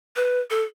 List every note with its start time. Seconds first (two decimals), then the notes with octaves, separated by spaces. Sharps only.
0.16 B4
0.50 A4